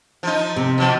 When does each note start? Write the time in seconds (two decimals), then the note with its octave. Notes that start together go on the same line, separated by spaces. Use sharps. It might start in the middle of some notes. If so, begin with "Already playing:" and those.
0.23 F3 D#4
0.56 C3
0.78 B2 F3